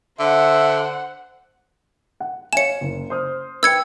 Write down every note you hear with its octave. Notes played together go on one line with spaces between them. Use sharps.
D3 C5 E5 F#5
F#5
C#5 F5 G#5 C#7 E7
F#1
C5 D#6 F6
B4 G5 E6 G#6 C#7